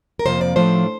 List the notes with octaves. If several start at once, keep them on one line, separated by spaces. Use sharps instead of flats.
A#4
F2 C3 F3 A#3 C5
D5
A2 F3 A3 D4 F4 C5